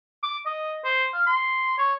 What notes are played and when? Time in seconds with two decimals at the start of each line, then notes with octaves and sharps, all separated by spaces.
0.23 D6
0.46 D#5
0.84 C5
1.14 F5
1.26 C6
1.78 C#5